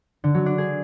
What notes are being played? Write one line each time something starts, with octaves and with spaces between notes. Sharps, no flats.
D3
F#3
D4
G#4